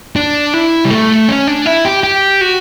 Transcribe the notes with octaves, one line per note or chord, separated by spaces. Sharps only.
D4
E4
G3
A3
C#4
D4
E4
G4
G4
F#4